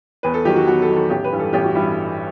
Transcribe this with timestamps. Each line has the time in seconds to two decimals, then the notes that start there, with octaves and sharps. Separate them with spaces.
0.23 E2 B4
0.34 A4
0.45 D#3 F#3 G4
0.56 F#4
0.67 E2 F#4
0.82 A4
0.89 D#3 F#3
0.96 A4
1.10 A1 G4
1.24 B4
1.32 G2 E3 G3
1.39 A4
1.53 A1 G4
1.64 F#4
1.74 G2 E3 G3 E4